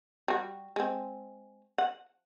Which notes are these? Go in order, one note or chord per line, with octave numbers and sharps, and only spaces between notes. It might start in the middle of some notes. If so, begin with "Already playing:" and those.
G3 F#4
G#3 C4
F#5